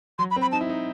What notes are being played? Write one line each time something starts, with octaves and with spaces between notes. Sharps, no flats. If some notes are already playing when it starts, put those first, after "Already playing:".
F#3 C6
B5
C4
B5
D#4 A5
E4
D#4